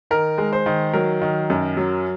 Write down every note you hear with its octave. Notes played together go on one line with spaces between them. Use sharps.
D#3 A#4
G#3
C5
D#3
F#3 A#4
D#3
F#2
F#3